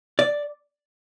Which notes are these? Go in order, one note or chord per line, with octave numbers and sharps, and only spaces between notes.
D5